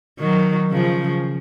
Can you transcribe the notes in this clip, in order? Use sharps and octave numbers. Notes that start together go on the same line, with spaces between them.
D#3 F#3
C#3 F3